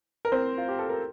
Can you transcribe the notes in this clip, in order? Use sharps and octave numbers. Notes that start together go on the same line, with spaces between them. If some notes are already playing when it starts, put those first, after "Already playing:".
A#4
C4 C5
F4
G4
A4
A#4